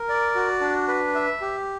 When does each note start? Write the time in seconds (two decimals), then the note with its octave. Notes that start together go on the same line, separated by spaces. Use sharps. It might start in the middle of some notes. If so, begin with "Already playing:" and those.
Already playing: A#4
0.09 D5
0.35 F#4
0.61 D4
0.88 B4
1.15 E5
1.41 G4